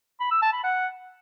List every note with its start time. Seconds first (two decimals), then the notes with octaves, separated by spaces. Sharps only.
0.20 B5
0.31 E6
0.42 A5
0.53 B5
0.64 F#5